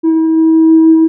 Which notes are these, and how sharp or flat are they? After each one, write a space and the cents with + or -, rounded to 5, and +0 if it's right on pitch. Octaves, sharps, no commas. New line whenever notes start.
E4 -40